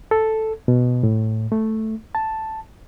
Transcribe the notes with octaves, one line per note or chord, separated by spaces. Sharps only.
A4
B2
A2
A3
A5